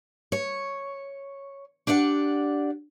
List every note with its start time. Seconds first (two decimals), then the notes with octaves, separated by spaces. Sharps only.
0.32 C#5
1.87 D4 G4 D5 F#5